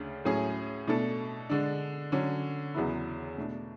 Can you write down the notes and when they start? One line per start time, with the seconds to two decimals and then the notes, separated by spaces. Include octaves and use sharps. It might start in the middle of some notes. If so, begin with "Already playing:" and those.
Already playing: D2 C#3 A3 D4
0.25 A2 F#3 C#4 G#4
0.87 B2 A3 D4 A4
1.49 D3 G#3 D4
2.12 D3 F#3 C#4
2.75 E2 C#3 F#3 B3 E4
3.37 B2 A3 D4